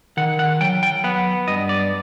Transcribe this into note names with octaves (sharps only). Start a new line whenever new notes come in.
D#3 F#5
F#5
F#3 G5
G5
B3 F#5
G2 D#5
D5